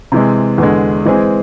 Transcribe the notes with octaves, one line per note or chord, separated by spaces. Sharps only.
C3 E3 G#3
E2 D3 G#3
E3 G#3 C4 G#4